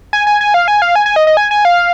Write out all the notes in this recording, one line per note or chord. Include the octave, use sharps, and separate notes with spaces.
G#5
G#5
G#5
F5
G#5
F5
G#5
G#5
D#5
D#5
G#5
G#5
F5